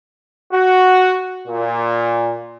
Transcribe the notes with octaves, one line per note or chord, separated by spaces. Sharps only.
F#4
A#2